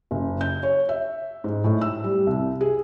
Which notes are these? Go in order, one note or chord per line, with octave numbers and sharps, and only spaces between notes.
F#1
G6
C#5
E5
G#2
A2
E6
G3
C2
G#4